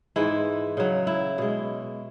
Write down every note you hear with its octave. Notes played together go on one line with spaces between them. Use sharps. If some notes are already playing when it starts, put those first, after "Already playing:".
G#2 E3 G#3 E4
C#3 F#3
E4
B2 G#3